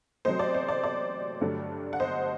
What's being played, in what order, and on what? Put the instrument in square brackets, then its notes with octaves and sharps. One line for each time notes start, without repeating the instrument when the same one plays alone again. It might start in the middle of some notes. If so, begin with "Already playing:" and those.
[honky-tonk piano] C3 F#3 A3 C5 D#5
D5
C5
D5
D5
G2 D3 F#3 A3
F#5
C5 D#5